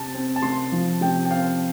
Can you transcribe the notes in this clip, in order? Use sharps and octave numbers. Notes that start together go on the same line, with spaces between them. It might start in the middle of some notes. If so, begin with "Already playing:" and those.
Already playing: C3 A5
C4
A5
C3 C6
F3
C3 G5
G5
C4 F5